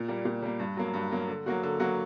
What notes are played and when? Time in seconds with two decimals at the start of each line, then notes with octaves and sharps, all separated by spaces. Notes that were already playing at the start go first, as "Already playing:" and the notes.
Already playing: A#2
0.08 G3 A#3
0.25 A#2
0.42 G3 A#3
0.60 G2
0.77 F#3 A#3
0.94 G2
1.12 F#3 A#3
1.28 D3
1.46 F#3 A#3 F#4
1.63 D3
1.80 F#3 A#3 F#4